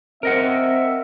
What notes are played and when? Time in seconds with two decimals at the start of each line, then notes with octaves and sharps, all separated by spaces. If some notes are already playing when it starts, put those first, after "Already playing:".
0.23 C4 A#4 D#5 E5 F#5